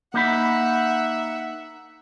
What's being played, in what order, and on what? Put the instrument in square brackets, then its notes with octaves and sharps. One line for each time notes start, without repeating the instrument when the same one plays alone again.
[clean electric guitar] A#3 D#4 B5 [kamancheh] E5 F#5